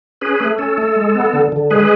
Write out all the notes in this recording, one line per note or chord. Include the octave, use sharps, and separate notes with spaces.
C#4 G#4 B4
A3
C#4 A4
A3
G#3
B3
D3
D3
G#3 G#4 B4